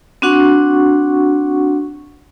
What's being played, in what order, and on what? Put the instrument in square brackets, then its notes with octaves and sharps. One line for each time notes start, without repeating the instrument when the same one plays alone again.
[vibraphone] C4 D4 F#4 F#5 C#6